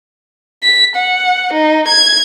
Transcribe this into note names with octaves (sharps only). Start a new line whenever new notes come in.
B6
F#5
D#4
G#6